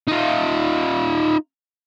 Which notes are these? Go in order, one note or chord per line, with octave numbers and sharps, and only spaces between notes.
D#4 F4